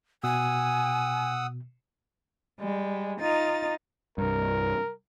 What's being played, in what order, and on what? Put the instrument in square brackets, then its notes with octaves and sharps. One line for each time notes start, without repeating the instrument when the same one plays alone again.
[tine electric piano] B2 [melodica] F#5 D#6 E6 [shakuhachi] G#5
[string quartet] G3 G#3
D#4 F4 A6
[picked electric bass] C2 G2 [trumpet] A#4